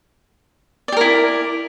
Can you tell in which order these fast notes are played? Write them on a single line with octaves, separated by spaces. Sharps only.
D5 G4 A#4 E4